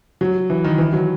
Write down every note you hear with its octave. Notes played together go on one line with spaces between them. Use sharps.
F#3
E3
D#3
E3
F#3